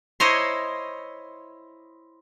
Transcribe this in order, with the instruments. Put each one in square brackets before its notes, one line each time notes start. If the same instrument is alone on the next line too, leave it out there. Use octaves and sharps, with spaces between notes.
[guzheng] E4 C5 C#5 D#5 A#5 C6